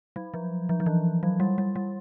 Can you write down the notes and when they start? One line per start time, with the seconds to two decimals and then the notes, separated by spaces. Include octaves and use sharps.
0.16 F#3
0.34 F3
0.69 F3
0.80 F3
0.86 E3
1.23 F#3
1.40 G3
1.58 G3
1.76 G3